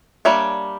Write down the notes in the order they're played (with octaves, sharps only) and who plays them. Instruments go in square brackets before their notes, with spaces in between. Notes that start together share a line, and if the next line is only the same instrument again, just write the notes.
[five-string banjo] G3 A#3 D4 C#5 E5